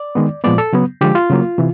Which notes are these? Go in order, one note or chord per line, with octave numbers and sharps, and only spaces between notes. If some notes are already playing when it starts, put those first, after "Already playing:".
Already playing: D5
D#3 G#3 B3
A#2 F3 G#3 B3 D5
A4
C#3 F#3 B3
D3 F3 G#3 G4
F4
C#3 F#3 A#3
C3 E3